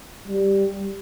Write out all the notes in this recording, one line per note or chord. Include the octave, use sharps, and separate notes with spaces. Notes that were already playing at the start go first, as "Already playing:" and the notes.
G3